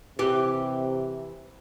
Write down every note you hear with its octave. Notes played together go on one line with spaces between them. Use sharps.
C3 E3 G4